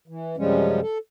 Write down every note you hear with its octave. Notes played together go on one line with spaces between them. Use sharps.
E3
F#2 C3 F3 G3 G#3 C#4
A4